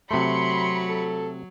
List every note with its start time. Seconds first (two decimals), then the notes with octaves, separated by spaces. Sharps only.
0.11 C3 F#3 A3 B5 C6 C#7
0.89 A4